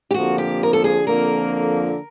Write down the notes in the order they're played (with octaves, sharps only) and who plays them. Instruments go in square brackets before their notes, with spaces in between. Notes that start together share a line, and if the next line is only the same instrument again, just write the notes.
[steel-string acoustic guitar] G4
[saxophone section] F2 D3 F3 A#3 [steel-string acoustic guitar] F#4
[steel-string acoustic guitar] G4
A#4
A4
G#4
[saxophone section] F2 D3 F3 A#3 [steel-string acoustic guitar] A#4